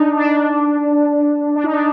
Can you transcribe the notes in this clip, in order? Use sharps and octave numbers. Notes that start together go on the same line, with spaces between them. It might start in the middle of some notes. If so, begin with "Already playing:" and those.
Already playing: D4 D#4
D4
D4
D#4
D4